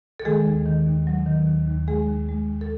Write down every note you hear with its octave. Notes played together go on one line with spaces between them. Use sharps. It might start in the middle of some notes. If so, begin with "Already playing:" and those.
A4
D#3 G#3 G#4
D#2
D#3
D#2
F#3
D#3
D#2
D#2
G#3 G#4
D#2
G#3
D#2
A4